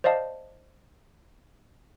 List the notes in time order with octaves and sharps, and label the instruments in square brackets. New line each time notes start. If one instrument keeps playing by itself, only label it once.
[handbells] C5 D5 D#5 F5 A5